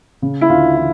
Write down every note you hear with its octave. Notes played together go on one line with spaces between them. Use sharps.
C#3
E4
D2 F4
E3 F4